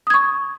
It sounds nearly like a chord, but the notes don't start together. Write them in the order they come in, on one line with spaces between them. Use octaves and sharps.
D#6 G#6 C#6